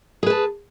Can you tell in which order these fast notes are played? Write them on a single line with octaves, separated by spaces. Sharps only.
G#4 B4 A5